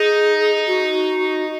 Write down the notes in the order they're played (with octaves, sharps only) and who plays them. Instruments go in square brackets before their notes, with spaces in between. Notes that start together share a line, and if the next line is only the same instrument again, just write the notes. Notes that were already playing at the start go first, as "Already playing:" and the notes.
Already playing: [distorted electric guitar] D#4 [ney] G#4
[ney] F#4